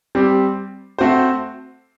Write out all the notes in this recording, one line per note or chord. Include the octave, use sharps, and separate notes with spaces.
G3 C4 G4
A3 C4 F#4 C5